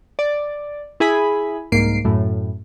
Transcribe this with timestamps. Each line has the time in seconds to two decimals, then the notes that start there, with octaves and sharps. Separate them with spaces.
0.19 D5
1.00 E4 G#4 G#5 B5
1.72 C2 G#2 A#3 C7 D7
2.05 F#2 A2